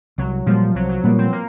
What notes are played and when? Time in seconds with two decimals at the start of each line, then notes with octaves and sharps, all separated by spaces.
0.18 C2 F#3
0.46 A#2 F3 G3 A#3
0.75 C2 F#3
0.89 F#3
1.04 A#2 G3 A#3 B3
1.18 C4
1.32 A#3